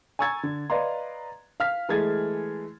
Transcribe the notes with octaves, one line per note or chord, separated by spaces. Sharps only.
G#5 A#5 C#6 E6 G#6 A6
D3
B4 D5 D#5 F5 A#5 C6
F5 F6 B6
E3 G#3 A3 G#4 G#6 A6